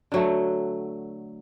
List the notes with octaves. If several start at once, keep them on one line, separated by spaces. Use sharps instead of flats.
D3 F#3 A3